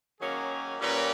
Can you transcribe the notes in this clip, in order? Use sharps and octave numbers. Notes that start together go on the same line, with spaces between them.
D#3 F#3 A#3 C#4 G#4
A#2 G3 A#3 C#4 B4